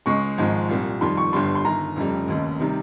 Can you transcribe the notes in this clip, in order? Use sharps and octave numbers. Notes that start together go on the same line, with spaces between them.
C#2 C#3 G#3 C#6
G#1 G#2 F3 G#3
C2 A#2 G3
F2 D#3 G3 C6
C#6
G1 G2 G3 C6
C6
G1 G2 D#3 A#5
F1 F2 C#3 G3
F1 D#2 C#3
C3 D#3 G3